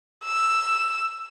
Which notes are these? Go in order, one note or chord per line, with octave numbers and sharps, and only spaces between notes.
E6